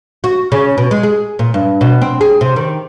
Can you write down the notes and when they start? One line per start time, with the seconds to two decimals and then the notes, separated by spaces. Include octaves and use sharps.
0.24 F#4
0.52 C#3
0.78 B2
0.91 G#3
1.03 G#4
1.39 A#2
1.54 G2
1.81 B2
2.02 C4
2.21 G#4
2.41 C3
2.56 D#3